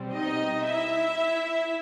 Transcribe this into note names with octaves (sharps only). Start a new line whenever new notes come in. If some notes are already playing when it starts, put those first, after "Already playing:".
Already playing: B2 G3 C4
D#4 D#5
E4 E5